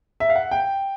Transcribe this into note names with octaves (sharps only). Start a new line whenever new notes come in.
E5
F5
F#5
G5